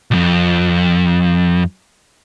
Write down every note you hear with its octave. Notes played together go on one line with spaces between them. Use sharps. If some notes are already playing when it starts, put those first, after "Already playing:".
B1 F2